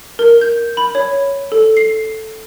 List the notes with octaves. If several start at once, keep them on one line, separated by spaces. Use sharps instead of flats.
A#4
G6
B5
C#5
A4
C7